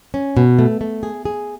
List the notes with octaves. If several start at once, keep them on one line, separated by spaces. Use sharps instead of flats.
C#4
B2
A3
A3
G#4
G#4